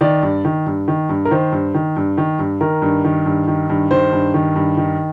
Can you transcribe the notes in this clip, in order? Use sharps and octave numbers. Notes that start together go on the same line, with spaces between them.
D#3 D5
G2
D#3
G2
D#3
G2
A#4
D#3 C5
G2
D#3
G2
D#3
G2
D#3 A#4
G2
D#3
G2
D#3
G2
D#3 C5
G2
D#3
G2
D#3